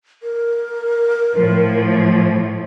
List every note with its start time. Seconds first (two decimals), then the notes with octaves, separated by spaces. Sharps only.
0.23 A#4
1.36 A2 F3